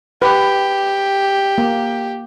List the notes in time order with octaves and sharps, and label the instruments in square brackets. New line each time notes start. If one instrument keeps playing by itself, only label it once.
[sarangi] G4 [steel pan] B4
[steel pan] A#3